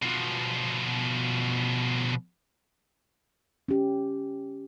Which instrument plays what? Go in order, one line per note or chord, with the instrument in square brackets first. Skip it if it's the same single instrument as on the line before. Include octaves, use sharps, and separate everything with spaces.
[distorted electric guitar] B2 F3
[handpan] C#4 G4